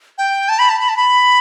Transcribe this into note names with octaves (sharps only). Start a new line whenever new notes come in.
G5
A5
B5
A5
B5
A5
B5